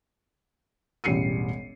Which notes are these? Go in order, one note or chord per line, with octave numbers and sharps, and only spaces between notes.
E1 A1 G3 C7 C#7 D#7